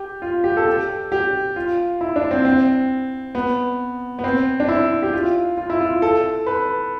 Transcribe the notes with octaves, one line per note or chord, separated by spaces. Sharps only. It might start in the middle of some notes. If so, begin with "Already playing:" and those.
Already playing: G4
F4
G4
A4
G4
G4
F4
E4
D4
C4
C4
B3
B3
C4
D4
E4
G4
F4
F4
E4
F4
A4
B4